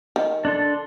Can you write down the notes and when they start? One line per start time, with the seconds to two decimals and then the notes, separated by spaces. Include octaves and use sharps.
0.16 D#3
0.45 D4 A4 C6